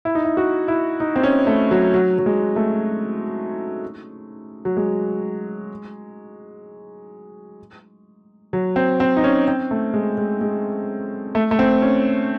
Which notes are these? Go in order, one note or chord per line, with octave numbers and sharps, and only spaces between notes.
E4
D#4
E4
F#4
E4
D#4
C4
C#4
A3
F#3
F#3
F#3
G#3
A3
F#3
G#3
F#3
C4
C4
D#4
C#4
C4
A3
G#3
G#3
G#3
A3
A3
C4
C#4